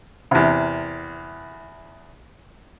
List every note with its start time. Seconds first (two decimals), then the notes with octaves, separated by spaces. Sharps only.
0.31 E2 C3